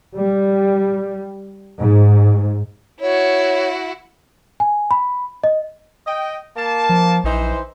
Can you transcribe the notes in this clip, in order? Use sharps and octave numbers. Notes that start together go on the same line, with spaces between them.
G3
G#2
E4 F#4 C#5
G#5
B5
D#5
D#5 G5
A#3 A5
F3
A#1 E3 D#4 C5